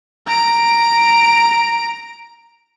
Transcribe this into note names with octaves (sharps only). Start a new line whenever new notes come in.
A#5 D7